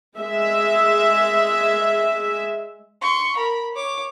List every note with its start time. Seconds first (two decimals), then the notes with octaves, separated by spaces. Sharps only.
0.18 G#3 E5
3.02 C6 C#6
3.36 A#4 B5
3.73 C#5 D6